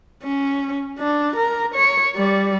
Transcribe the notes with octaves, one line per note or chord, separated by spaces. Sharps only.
C#4
D4
A#4
C#5
G3 D5